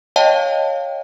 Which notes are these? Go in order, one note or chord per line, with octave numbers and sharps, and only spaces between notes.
C#5 D#5 F5 G5 A5